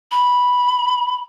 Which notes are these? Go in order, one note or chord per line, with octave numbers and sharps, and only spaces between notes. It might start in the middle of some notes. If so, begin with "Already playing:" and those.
B5